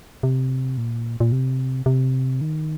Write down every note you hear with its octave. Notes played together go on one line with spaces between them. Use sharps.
C3
A#2
A#2
C3
C3
D#3